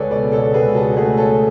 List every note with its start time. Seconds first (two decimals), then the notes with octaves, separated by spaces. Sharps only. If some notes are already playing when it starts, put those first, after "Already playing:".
Already playing: C#2 G#4 A4 B4 C#5 D5
0.11 B2 B4 D5
0.32 A4 C#5
0.53 C#2 G#4 B4
0.75 F#4 A4
0.96 A3 G#4 B4
1.17 A4 C#5